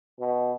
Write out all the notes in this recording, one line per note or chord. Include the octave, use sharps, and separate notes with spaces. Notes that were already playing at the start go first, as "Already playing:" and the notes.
B2